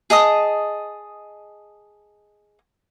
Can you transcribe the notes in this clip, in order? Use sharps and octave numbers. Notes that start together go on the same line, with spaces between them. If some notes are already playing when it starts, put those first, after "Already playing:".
G#4 D#5 A5 D#6